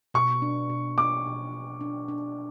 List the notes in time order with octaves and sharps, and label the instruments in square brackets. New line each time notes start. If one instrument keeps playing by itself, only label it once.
[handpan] B2 [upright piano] C#6
[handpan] D4
B2
[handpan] B2 [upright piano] D6
[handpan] B2
B2
D4
D4